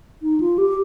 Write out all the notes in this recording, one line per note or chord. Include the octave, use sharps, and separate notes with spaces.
D#4
F4
G4